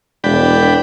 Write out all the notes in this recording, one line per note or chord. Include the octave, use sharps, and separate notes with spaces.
E1 D4 G5 B5